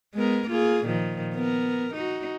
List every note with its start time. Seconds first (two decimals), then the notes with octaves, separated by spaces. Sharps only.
0.15 G#3 B3 A#4
0.48 A#3 F4 G#4
0.85 A#2 D#3 F3
1.35 B3 A#4
1.94 D#4 F#4